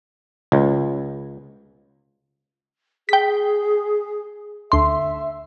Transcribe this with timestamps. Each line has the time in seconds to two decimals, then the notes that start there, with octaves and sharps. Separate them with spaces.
0.52 C#2
3.09 G#4 G5 B6
4.72 D2 E5 C6